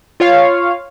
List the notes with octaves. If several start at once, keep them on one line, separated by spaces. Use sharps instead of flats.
F4 C#5 F5